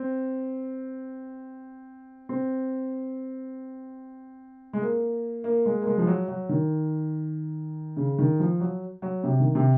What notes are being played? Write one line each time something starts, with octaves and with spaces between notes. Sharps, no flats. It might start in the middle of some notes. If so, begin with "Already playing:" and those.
Already playing: C4
C4
G#3
A#3
A#3
G#3
A#3
G#3
F3
F#3
F#3
D#3
C#3
D#3
F3
F#3
F#3
C3
D#3
C3